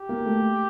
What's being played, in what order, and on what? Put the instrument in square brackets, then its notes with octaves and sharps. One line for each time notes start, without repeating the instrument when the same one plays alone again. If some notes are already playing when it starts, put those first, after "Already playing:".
Already playing: [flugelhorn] G4
[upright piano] A#3
A3